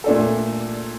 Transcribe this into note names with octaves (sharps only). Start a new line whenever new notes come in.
A#2 A3 D4 A4